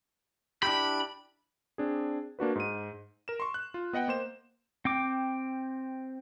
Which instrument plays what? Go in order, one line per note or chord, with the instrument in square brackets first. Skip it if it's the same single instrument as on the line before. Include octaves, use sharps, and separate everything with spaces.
[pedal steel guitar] D4 E4 G4 [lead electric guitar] B5
[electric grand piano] C4 D4 G#4
A#3 D4 F#4 B4
G#2 D#7
A#4 E7
C6 C#6
F#6
F4
B3 D#5 F#5 G5
A#3 C5 E7
[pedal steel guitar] C4 G5 D6